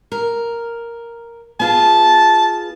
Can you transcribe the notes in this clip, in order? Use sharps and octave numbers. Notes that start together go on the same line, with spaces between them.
A#4
B3 F4 G#4 A5